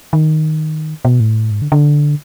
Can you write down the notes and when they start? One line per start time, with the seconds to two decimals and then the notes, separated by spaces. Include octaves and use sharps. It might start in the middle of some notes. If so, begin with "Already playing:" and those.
0.13 D#3
1.05 B2
1.20 A2
1.51 G#2
1.62 D3
1.72 D3